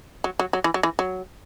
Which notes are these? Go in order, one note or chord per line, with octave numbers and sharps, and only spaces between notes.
F#3
F#3
F#3
E3
F#3
E3
F#3